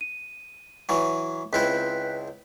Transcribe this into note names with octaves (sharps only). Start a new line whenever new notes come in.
D#7
E3 F#3
C#2 C4 E4 B4 F#6 B6